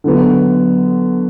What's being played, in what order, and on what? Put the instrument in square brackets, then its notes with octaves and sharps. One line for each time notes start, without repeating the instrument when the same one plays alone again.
[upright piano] D3 F#3 B3